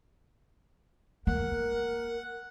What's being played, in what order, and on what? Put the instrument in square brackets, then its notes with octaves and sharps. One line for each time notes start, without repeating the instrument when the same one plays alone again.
[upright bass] A#3 [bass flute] A#4 [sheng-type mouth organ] F#5